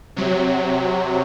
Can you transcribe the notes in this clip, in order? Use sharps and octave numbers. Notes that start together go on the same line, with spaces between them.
C3 F#3